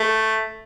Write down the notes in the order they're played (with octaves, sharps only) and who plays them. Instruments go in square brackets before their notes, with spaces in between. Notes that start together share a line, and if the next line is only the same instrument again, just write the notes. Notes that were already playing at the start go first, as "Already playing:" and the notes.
Already playing: [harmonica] A3